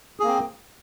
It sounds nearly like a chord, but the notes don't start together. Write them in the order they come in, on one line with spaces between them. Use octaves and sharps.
G#4 A#3 C4